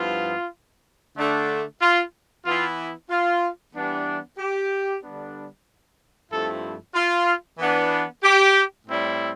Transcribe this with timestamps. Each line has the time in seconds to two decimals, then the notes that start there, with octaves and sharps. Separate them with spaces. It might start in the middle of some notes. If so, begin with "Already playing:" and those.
Already playing: G2 F3 B3 E4 F4
1.17 D3 A3 D4
1.81 F4
2.46 E3 B3 E4 F4
3.10 F4
3.74 E3 G3 B3 D4
4.38 G4
5.02 D3 G3 B3 D4
6.30 G2 F3 A3 C4 E4 A4
6.95 F4
7.58 E3 B3 D4
8.23 G4
8.87 A2 G3 C4 E4